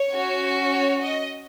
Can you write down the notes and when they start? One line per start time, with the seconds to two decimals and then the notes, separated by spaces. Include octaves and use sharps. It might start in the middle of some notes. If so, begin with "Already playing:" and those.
Already playing: C#5
0.11 C#4 F#4
0.72 C#5
1.02 D#5